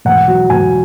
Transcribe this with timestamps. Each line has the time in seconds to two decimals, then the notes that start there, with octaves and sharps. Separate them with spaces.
0.05 E1 F#5
0.28 F#3
0.50 E1 G#5